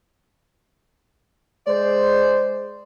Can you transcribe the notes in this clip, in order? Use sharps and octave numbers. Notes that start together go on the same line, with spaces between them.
G#3 C5 D5